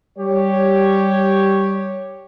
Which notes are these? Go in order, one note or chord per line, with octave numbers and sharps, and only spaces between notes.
G3 G4 C#5